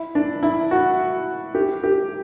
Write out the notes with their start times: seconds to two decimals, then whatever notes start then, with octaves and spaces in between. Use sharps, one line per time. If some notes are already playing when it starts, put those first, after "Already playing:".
Already playing: E4
0.15 D4
0.43 E4
0.71 F#4
1.55 G4
1.84 G4